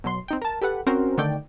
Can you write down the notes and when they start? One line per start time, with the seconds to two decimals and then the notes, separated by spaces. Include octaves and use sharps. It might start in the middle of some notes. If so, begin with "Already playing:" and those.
0.04 B2 F#3 C6
0.28 C4 D#4 G5
0.42 A#4 A5
0.62 G4 A4 B4 F#5
0.87 C4 C#4 F#4 A#4 C5
1.18 D3 D#3 A3 D5 G5